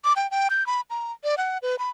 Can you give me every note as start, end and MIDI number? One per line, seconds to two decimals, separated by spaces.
0.04 0.13 86
0.16 0.29 79
0.31 0.48 79
0.50 0.66 91
0.67 0.81 83
0.90 1.12 82
1.24 1.35 74
1.38 1.58 78
1.62 1.76 71
1.79 1.90 83